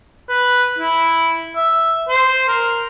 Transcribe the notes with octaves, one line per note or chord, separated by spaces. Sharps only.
B4
E4
E5
C5
A#4